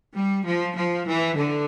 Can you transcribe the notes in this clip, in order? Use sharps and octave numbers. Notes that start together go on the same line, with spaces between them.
G3
F3
F3
E3
D3